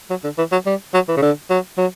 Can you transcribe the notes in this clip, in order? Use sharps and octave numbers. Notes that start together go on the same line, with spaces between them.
F#3
D3
E3
F#3
G3
F#3
E3
C#3
D3
F#3
F#3